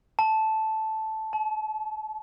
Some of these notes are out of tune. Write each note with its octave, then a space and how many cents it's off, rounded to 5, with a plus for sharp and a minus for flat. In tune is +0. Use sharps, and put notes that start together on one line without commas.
A5 -5
A5 -40